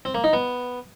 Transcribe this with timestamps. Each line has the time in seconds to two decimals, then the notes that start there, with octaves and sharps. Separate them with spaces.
0.05 C4
0.15 A#3
0.24 D#4
0.33 B3